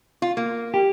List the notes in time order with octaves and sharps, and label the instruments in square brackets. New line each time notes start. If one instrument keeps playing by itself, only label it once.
[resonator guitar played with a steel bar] F4
A#3
[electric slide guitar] G4